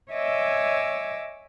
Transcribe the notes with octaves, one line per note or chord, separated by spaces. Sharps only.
C#5 D#5 E5 G#5 D6 E6